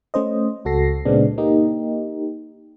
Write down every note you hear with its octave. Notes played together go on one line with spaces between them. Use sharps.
A3 C#4 C5 D#5
C#2 F#4 A4 A#6 C7
A#2 C#3 G#3 B3 C4 D4
A#3 D#4 G4